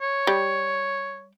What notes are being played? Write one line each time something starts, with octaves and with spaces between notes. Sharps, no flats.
C#5
G3